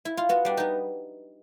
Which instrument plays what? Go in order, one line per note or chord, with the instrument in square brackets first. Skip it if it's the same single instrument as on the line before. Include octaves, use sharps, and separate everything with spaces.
[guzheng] E4
F4
B3 F#4
G3 D4
B3 D#4